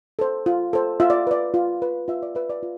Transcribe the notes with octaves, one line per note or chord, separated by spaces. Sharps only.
A4 C5
F4
A4 C5
F4 E5
D5
B4 D5
F4
B4
F4 E5
D5
B4 E5
D5
F4